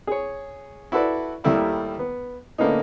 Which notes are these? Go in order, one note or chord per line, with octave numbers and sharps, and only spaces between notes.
G#4 C#5
E4 F#4 A4 B4 D5
D#2 D#3 G3 A3 E4 B5
B3
A2 D3 A#3 B3 C#4 D#4